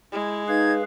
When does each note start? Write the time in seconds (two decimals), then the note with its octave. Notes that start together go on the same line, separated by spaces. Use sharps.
0.12 G#3 E4
0.48 D#4 G#4 B4 F5 G#6